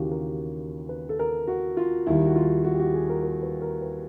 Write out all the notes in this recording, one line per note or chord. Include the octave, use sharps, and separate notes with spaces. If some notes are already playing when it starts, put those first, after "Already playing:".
Already playing: D#2 C#3 E3 F#4 G4
A#4
B4
A4
A#4
F#4
F4
D#2 D#3 G3 E4
F#4
F4
F#4
G4
F#4
G#4
A#4
A#4
B4
A#4
B4